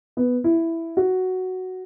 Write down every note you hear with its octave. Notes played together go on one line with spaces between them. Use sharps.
B3
E4
F#4